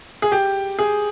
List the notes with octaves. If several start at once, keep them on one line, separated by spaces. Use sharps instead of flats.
G#4
G4
G#4